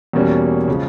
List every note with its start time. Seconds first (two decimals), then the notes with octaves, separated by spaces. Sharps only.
0.13 E2 B2 G3 A#3 C#4
0.68 C#3 F3 G#3